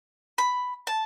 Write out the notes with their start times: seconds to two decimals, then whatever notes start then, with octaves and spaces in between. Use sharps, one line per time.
0.38 B5
0.87 A5